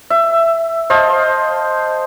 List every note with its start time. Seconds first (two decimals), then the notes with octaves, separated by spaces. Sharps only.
0.10 E5
0.90 C5 D#5 F5 A5